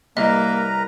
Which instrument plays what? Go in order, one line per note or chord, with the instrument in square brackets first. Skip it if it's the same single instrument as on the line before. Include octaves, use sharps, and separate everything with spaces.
[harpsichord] C2 [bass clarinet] A#3 [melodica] A#4 B4 A#5 [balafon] D#5